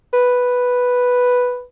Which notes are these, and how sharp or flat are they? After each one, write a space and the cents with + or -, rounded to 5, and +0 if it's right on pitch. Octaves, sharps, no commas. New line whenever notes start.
B4 +0